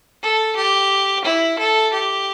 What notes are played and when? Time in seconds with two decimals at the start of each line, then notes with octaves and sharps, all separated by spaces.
0.22 A4
0.56 G4
1.25 E4
1.59 A4
1.93 G4